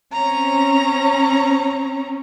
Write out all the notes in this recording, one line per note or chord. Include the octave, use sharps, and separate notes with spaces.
C4 C#4 A#5